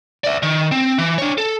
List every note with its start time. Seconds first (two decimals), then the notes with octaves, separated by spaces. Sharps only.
0.24 D5 E5
0.43 D#3
0.72 C4
0.99 E3
1.18 D4 C#5
1.38 A4